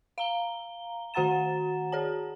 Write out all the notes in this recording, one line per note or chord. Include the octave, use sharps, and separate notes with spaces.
F5 A#5 G7
D#3 F#4 F#5 A#5 A6 E7
G#4 C#5 A5